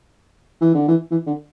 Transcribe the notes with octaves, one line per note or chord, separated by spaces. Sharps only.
E3
D3
E3
E3
D3